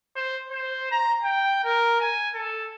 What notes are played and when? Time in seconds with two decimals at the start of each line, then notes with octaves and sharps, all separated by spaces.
0.16 C5
0.50 C5
0.91 A#5
1.22 G5
1.64 A#4
2.00 G#5
2.34 A4